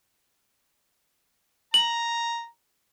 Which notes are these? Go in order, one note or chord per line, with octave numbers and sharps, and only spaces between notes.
A#5 F#7